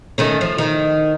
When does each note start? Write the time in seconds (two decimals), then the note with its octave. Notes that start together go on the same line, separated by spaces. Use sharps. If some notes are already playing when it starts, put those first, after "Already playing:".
0.18 D#3 A3 C#4
0.41 F3
0.58 D#3